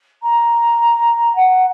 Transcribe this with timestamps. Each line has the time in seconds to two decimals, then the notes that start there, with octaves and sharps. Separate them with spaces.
0.22 A#5
1.35 F#5